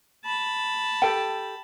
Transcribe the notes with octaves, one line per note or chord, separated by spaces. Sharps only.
A5 B5
G4 A4 G5